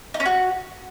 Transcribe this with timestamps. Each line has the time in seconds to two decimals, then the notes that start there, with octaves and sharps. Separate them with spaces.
0.14 D#4
0.20 C#4
0.26 F#4